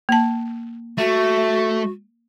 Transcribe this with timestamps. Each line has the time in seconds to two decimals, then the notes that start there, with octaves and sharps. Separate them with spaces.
0.09 A#3 A5
0.98 A3 F#4